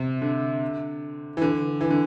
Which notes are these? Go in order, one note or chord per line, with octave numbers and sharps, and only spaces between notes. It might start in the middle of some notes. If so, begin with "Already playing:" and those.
Already playing: C3
D3
E3
D3
E3
D3